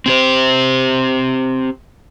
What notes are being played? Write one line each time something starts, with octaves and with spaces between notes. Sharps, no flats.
C4 G4 C5